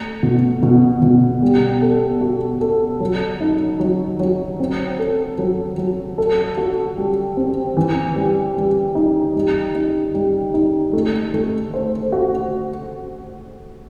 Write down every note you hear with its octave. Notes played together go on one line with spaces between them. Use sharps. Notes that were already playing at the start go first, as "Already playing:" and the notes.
Already playing: A3
B2
B2
B2
G3
A4
F#4
A4
F#3
D#4
F#3
F#3
C4
A4
F#3
F#3
A4
F#4
G3
C4
E3
G3
G3
D#4
G3
D#4
G3
D#4
A3
A3
C5
F#4